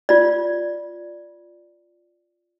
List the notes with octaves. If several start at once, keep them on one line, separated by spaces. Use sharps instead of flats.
F4 D5